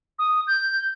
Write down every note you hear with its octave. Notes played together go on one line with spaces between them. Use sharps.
D#6
G6